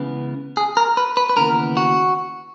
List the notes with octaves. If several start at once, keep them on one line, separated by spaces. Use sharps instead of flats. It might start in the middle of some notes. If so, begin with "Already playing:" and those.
Already playing: C#2 C#3 E3 B3
G#4
A#4
B4
B4
B4
D#2 C#3 E3 B3 A#4
F#4